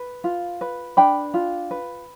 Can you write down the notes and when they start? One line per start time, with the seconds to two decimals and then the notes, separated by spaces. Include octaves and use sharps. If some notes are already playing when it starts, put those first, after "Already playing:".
Already playing: B4
0.24 F4
0.61 B4
0.97 D4 G5 B5
1.34 F4
1.71 B4